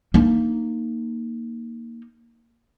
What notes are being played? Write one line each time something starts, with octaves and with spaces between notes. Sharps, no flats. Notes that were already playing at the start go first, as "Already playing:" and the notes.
A#3 D#4